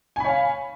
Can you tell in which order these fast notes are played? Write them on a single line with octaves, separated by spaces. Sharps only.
G#5 B5 C#5 F5